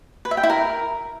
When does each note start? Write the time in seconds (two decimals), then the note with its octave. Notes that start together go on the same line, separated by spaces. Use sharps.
0.25 B4
0.31 E5
0.37 G5
0.43 E4
0.50 A#4